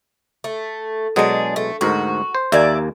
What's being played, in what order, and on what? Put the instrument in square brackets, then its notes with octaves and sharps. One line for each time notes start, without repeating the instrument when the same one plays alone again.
[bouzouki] A3
[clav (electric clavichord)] B2 F#3 G#3 [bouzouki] D4 G#4
[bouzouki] A3
[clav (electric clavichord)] D2 G#2 A#4 [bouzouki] F#4
[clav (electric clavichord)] C5
[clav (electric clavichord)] D#2 A#3 G#5 [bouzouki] D5 E5